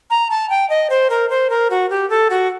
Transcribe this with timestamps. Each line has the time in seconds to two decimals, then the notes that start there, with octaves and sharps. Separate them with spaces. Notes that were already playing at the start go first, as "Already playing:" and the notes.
0.10 A#5
0.30 A5
0.50 G5
0.69 D#5
0.90 C5
1.10 A#4
1.30 C5
1.50 A#4
1.70 F#4
1.90 G4
2.10 A4
2.30 F#4